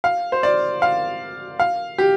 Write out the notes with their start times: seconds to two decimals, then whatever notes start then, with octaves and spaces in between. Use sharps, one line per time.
0.04 F5
0.32 C5
0.43 D5
0.82 F5
1.59 F5
1.98 G4